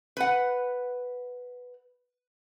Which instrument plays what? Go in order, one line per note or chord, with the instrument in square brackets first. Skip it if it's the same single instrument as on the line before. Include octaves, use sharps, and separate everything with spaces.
[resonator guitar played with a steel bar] B4 F#5